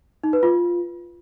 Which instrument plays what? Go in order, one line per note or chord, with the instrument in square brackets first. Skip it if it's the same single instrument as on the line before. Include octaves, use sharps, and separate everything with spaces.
[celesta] D#4
B4
F4